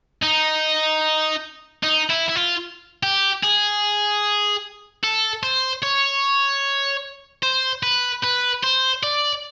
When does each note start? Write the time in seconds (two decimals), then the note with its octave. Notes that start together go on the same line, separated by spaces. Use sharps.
0.23 D#4
1.83 D#4
2.10 E4
2.29 E4
2.36 F4
3.03 G4
3.43 G#4
5.03 A4
5.43 C5
5.83 C#5
7.43 C5
7.83 B4
8.23 B4
8.63 C5
9.03 D5